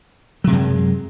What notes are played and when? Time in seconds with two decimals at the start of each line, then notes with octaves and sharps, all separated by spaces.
0.44 F#3
0.47 C3
0.50 G#3
0.52 F#2